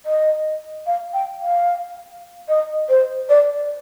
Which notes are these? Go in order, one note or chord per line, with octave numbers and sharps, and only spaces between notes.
D#5
F5
G5
F5
D#5
C5
D5